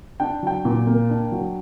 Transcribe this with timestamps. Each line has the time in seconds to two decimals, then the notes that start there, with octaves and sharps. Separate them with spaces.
0.20 D4 G5
0.43 F#3 G5
0.65 A#2
0.87 A#3
1.10 D4
1.32 F#3